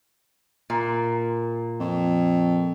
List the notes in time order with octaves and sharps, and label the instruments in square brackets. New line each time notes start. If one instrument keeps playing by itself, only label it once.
[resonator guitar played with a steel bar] A#2
[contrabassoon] F2